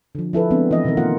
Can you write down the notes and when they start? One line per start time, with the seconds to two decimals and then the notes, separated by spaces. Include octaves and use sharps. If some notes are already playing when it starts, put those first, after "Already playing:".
0.15 D3 F3
0.33 F3 E4 A4 B4
0.50 F3 G#3 B3 C4 D4
0.71 E3 B3 D#5 E5
0.84 B2 D3 D#3 C4 A#4
0.97 A#3 F4 A#4 F#5